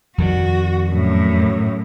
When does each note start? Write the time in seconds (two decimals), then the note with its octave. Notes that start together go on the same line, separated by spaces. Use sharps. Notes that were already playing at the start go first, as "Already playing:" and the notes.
0.18 F2 D#3 G3 F#4
0.89 F#2 A2